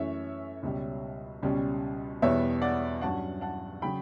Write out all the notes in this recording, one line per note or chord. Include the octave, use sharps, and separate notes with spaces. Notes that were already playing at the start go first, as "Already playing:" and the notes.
Already playing: F#2 E3 A3 C#4 C#5 E5
C#2 B2 G3
C#2 B2 G3 C#4
E2 B2 G3 B3 C#5 E5
D5 F#5
G2 F#3 C#4 F#5 A5
F#5 A5
C#3 F#3 G5 B5